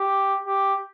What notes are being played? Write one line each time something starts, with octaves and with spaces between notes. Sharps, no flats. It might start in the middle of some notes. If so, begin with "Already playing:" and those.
Already playing: G4
G4